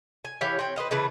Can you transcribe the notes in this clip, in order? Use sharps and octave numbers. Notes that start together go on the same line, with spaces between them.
G#5
E3 G4 C#5 F5
C4 C#5 G5
B4 C5 D#5 F5
C#3 E3 A3 B4